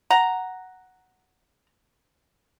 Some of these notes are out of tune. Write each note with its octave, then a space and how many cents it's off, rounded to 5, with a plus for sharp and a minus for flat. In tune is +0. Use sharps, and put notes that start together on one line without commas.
F#5 +0 A#5 +0